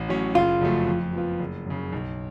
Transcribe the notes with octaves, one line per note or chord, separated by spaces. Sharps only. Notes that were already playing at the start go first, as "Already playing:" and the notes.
Already playing: A1
A2 F#3 C#4
F#1 F4
F2 C#3 F#3 A3
F2
F3 B3 F4
F#1
F#2 C#3
B1